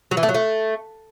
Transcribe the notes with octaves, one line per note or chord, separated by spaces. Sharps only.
F#3
E3
A3
F#3
A3